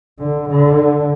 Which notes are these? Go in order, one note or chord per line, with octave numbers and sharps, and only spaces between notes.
D3
D3